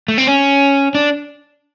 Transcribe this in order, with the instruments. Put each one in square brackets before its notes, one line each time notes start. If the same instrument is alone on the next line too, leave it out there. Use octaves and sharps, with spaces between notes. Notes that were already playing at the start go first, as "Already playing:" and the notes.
[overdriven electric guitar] A3
C4
C#4
D4